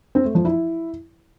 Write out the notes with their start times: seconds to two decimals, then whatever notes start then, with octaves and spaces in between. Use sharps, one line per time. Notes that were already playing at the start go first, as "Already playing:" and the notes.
0.15 C4
0.25 A3
0.35 F3
0.45 E4